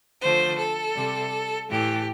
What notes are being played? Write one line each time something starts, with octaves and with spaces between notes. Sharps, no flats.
D3 F3 A3 C5
A4
C3 G3
A2 E3 A3 G4